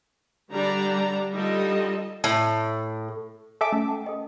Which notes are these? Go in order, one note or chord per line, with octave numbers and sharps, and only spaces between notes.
D3 G3 D4 G4 D5 A#5
D3 G3 D#4 F4 A4 D#5
A2
A4 E5 G#5 D6
A3 C#4
F#5 G5 A5
A4 D#5 G5